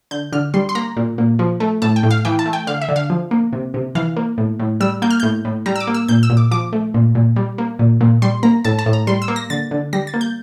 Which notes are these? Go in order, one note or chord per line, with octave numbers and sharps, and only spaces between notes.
D3 G6
D3 F6
G3 C6
C6
A#3 A#5
A#2
A#2
F3
A3
A2 A5
G5
A2
F5
E3 G5
A5
A3
G5
D3 F5
E5
D3
F5
F3
A#3
C3
C3
E3 F5
A#3
A2
A2
G3 E6
A#3 G6
F6
A2 G6
A2
G3 A#5
E6
D6
A#3
E6
A#2 G6
E6
A#2
D6
F3 D6
A3
A#2
A#2
G3
A#3
A#2
A#2
G3 C6
A#3 A#5
A2 A5
A5
A2
A#5
G3 C6
E6
A#3
A#6
D3 A6
D3
G3 A#6
A6
A#3
G6